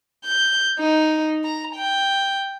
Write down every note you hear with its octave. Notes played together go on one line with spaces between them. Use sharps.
G6
D#4
A#5
G5